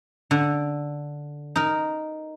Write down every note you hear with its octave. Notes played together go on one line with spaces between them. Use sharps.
D3
D#4 A#4